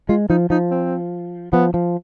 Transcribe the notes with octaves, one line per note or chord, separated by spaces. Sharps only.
G#3 F4
F3 D#4
F3 D#4
C4
F3 B3
F3